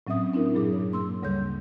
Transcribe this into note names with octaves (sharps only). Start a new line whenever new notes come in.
A2 F#3 C4 C#4 E5 D#6
C4 D4 E4 A#4
G2 A#2 F#3 G#4 D6
F#3 C#5
A#3 C6 E6
D2 C#3 G3 A4 C#5 G6